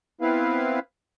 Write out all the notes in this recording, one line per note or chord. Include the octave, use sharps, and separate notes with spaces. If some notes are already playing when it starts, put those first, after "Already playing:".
B3 C4 E4 B4 F5